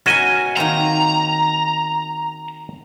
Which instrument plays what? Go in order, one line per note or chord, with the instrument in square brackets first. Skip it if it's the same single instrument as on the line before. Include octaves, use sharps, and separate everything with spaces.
[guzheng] B3 A#4 G#5 [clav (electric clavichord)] C#4 F#4 D#5
[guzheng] D#3 A#3 C4 [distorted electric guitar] A#5